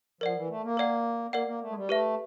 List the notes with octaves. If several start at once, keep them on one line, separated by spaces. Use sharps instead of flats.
F3 A#4 D5 F#5
E3
A3
A#3
A#4 D5 F#5
A#3 A#4 D5 F#5
A#3
A3
G#3
G3
A3 G4 B4 E5